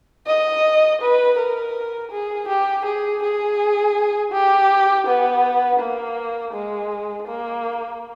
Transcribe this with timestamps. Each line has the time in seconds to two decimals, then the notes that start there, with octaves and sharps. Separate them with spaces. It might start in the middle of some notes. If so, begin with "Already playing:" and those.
0.27 D#5
1.01 B4
1.38 A#4
2.12 G#4
2.48 G4
2.85 G#4
3.23 G#4
4.32 G4
5.07 B3
5.79 A#3
6.53 G#3
7.28 A#3